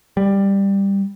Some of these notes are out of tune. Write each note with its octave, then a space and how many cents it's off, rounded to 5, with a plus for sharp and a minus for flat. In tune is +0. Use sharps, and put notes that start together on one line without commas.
G3 +10